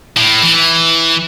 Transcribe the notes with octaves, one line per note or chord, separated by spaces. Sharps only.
A2
E3